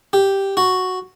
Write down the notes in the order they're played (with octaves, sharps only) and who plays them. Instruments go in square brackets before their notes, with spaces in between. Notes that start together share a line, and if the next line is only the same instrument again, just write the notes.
[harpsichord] G4
F#4